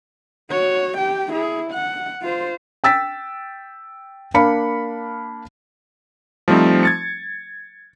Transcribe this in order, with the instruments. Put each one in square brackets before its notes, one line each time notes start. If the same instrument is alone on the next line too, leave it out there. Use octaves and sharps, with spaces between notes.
[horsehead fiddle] F#4 C#5
G4 G5
E4 G#4
F#5
F4 C5
[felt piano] G5 E6 A6 B6
A#3 D4 F5 B5 C#7
[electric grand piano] F3 G3 A3 C4 D#4
G#6 A6 C#7